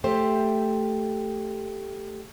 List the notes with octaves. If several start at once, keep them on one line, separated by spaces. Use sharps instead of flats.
A3 G4 C5